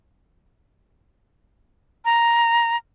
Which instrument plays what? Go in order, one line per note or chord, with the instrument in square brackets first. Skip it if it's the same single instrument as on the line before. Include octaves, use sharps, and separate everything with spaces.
[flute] A#5